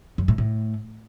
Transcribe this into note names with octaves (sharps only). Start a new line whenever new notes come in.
F#2
A2
A2